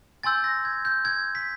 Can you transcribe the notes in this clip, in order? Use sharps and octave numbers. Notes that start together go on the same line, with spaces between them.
G#5 C6 E6 G6 A6
A#6
G#6
G6
G#6
B6